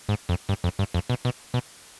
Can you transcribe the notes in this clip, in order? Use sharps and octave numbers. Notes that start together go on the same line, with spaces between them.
G#2
F2
G2
F2
G2
F2
B2
B2
B2